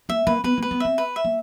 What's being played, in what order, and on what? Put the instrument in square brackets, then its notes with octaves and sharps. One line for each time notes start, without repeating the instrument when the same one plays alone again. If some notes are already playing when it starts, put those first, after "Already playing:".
[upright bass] A#3 [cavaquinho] E5
[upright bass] A#3 [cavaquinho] B4
[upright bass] B3 [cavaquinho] B4
[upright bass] A#3 [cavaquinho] B4
[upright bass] B3
[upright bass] C4 [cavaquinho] E5
[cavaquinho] B4
E5
[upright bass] A#3